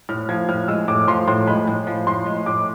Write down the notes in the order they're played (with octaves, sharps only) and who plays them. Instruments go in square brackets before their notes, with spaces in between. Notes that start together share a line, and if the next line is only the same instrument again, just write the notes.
[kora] A2 [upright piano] F6
[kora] F3 [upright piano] G#6
[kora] A2 [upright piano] F6
[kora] G#3 [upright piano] E6
[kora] A2 [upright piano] D6
[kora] F3 [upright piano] C6
[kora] A2 [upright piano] C6
[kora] G#3 [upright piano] B5
[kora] A2
F3
[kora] A2 [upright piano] C6
[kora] G#3
[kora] A2 [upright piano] D6